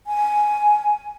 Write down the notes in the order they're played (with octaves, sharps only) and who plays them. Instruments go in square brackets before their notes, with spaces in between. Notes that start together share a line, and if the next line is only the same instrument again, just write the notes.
[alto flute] G#5